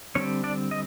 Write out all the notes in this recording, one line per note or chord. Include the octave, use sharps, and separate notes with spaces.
D3 G3 C4 C#4 C#5
D4 D5
D#5